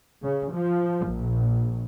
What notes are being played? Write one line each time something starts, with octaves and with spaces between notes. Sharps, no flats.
C#3
F3
A#1